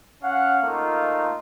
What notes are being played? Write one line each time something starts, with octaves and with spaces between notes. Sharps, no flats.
C#4 F5 F#5
A3 A#3 D#4 F4